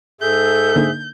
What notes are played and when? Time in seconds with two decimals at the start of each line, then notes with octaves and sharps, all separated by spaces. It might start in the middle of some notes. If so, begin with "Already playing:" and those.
0.21 G#2 G#4 A4 E5 G6
0.76 D3 A#3 D#4